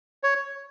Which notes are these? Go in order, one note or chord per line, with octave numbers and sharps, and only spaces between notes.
C#5